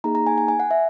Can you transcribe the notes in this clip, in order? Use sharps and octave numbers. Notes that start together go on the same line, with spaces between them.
A#3 D#4 G#4 A#5
A#5
G#5
G#5
G#5
F#5
E5